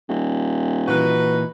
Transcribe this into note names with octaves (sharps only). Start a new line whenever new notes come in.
D#1
A#2 E3 D#4 F#4 B4